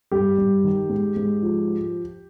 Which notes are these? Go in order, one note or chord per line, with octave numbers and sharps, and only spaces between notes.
G2 G4
G2
D#3
G#2
G#2
F3